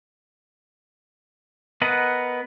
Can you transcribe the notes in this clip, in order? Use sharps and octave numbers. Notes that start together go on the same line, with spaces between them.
B3 A#4 B4 D#5 F#5